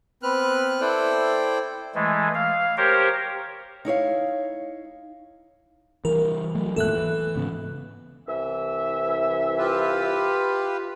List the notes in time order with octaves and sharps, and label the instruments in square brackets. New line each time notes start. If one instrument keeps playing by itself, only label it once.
[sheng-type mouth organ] B3 C4 B4 F6 F#6
E4 A4 C5 D5 G5
[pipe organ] E3 G#3 A3
F5
G4 A#4 C5 C#5
[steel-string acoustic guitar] D#4 E4 C#5 F5
[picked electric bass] E3 G3 [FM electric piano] A#4
[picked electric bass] F#3 A3
[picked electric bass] G#1 E2 A#2 [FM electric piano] A4 E5 F#6
[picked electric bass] E3
G#2 C#3 B3
[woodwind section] C2 E3 E5
[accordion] F4 G4 B4